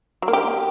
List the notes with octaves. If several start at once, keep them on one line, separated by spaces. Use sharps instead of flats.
F#3
A#3
G4